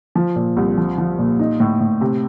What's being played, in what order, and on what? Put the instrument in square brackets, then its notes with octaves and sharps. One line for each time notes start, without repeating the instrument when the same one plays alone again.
[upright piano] F3
A#2
C2
F3
F3
A#2
D#4
A2
A2
C3